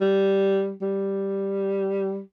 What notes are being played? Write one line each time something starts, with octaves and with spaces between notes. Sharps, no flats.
G3
G3